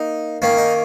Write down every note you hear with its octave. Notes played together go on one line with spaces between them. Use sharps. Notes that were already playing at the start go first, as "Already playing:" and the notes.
Already playing: A#3 D#4
D#3 A#3 C#4
D#4